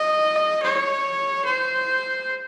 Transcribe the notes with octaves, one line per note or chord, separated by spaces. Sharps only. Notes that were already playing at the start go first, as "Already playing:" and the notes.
Already playing: D#5
C#5
C5